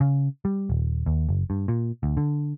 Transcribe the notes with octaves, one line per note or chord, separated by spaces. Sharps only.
C#3
G3
D#1
D#2
F#1
G2
A#2
D2
D3